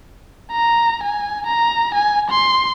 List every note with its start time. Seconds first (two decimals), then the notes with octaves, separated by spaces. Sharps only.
0.52 A#5
1.03 G#5
1.46 A#5
1.95 G#5
2.30 C6